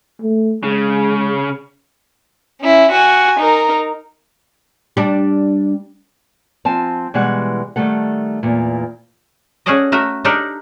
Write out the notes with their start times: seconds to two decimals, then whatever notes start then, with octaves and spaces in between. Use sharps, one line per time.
0.22 A3
0.63 C#3 G#3
2.61 C#4 E4
2.92 F#4 G#5
3.40 D#4 A#4
4.97 G3 D4
6.65 F3 C4 G#5 A5
7.14 B2 E3 G3 G#3 F#5
7.76 D#3 G3 A3 A4 F#5
8.43 E2 A#2
9.66 C#4 F#4 G#4 A4 D5 D#5
9.92 A3 F#4 A#4 E5
10.25 D4 D#4 G4 A4 A#4 D5